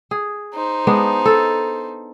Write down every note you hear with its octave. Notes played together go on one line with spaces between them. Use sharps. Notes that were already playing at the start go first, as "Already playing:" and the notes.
G#4
D#4 C5
G#3 B3 D4
A4